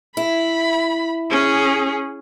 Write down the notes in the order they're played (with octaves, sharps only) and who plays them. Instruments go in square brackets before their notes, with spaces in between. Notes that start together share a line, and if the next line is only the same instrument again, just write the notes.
[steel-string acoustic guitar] E4 [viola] B5
[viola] C#4 G#4